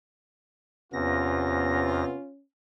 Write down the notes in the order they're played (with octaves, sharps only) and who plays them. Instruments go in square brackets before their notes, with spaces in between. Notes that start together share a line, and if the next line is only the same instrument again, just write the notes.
[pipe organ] E2 A#6 [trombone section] C3 B3 [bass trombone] C#4 [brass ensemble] F4